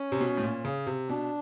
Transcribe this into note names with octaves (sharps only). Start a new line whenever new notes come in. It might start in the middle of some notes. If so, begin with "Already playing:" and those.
Already playing: C#4
C3
B2
A2
A#2
C#3
C3
B2 D4